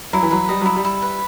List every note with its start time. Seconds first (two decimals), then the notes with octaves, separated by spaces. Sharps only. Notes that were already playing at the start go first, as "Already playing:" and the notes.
0.13 F#3 E4
0.23 E3
0.31 F#3 B4
0.49 G3 D#5
0.61 F#3 E4
0.76 G3
0.85 E4
1.02 B4